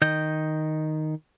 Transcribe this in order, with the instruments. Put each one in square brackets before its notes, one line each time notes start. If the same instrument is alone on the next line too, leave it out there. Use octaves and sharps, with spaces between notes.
[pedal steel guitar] D#3 D#5 G6